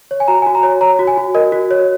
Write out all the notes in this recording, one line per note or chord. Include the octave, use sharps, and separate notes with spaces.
C#5
G#5
F#4 A#5
G#5
F#4
A#5
C#5
C#5 A#5
F#4
G#5
F#4
A#4 D#5
F#4
C#5